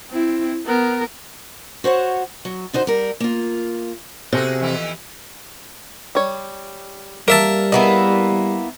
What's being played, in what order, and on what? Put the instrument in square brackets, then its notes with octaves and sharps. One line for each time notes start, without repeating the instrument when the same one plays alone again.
[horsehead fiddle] C4 E4
B3 A#4
[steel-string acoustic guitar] F#4 C5 C#5 F#5
F#3
D3 D#4 F#4 C5
G3 A#4
A#3 F4
[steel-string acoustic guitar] C3 [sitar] F#4 G#4 A4
[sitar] F2 E3 E4
[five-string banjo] G3 C#5
[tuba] G3 [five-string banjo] A#3 [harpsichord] A#4 E5 A5
[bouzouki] A#3 B3 E4 [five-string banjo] G#4 D#5